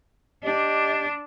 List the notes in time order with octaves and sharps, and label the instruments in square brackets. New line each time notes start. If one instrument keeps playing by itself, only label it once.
[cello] D4 [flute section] G4 D#5